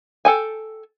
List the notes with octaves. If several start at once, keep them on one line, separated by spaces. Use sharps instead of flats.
A4 G5 G#5